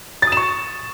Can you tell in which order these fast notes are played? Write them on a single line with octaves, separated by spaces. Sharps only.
A6 D#6 E7 C#6